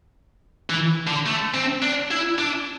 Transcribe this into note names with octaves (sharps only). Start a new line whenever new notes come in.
E3
D3
A3
C4
D4
E4
D4